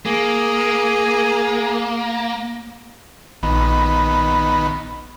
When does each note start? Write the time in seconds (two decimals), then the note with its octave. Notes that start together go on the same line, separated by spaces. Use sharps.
0.06 A#3 G#4
3.43 A#1 D#3 B3